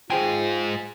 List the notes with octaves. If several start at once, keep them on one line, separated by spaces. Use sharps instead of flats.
G#2 F4 G#4 C5 G5 G#5